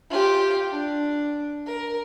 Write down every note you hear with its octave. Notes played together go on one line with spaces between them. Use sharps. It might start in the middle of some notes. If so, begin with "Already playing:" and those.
F4 G4
D4
A#4